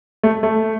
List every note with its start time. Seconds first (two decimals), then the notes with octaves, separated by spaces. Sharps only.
0.23 A3
0.43 A3